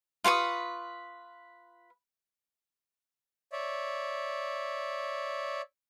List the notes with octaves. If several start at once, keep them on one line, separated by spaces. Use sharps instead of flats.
F4 B4 C#6 D#6
C#5 D5 E5